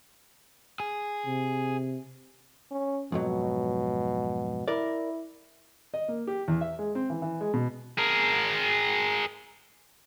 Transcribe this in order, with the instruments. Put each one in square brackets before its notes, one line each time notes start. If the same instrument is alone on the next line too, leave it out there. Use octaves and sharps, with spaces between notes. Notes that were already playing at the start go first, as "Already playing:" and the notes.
[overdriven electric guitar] G#4
[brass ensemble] C3
[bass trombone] C#4
[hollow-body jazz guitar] F2 G#2 F#3 [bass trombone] B2
[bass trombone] E4 [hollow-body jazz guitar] A#4 D5
[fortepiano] D#5
A#3
G4
E2
E5
G#3
C4
E3
E3
G#3
B2
[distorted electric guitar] G#4 A#4